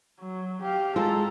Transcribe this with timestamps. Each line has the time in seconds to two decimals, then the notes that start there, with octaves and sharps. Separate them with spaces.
0.20 F#3
0.62 G4 F5
0.96 G#3 F4 A4 A#5